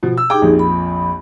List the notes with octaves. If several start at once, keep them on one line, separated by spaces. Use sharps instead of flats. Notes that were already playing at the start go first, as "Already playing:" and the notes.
B2 F3
E6
D#4 G4 G#4 G5 D6
A#1 F2
B5